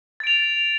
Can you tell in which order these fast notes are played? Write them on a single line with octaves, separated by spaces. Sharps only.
A6 D7 F7